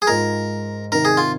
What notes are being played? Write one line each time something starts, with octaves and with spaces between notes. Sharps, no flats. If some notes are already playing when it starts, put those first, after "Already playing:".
G#4
G#2 G#3 F4 A#4
C3 D#3 C4 D#4 A#4
G#4
F4